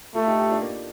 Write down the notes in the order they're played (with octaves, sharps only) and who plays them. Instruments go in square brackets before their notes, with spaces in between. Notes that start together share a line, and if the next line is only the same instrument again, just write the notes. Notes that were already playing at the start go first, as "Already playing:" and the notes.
[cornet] A3 [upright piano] F4 A4
[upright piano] D#4 G4
D#4 G4
D4 F4
A#3